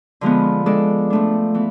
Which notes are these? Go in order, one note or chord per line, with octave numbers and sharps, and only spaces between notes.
D3 F3 G#3 B3
G#3 D4 A4 D5
F3 A3 D4
E3 B3